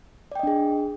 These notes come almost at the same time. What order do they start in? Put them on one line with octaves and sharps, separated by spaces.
D5 G5 D#5 D4 G#4